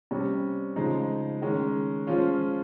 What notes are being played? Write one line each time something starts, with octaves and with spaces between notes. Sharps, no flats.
C3 G3 C#4
C#3 F3 G#3 D#4
D#3 G#3 C#4
F3 G#3 C#4 F4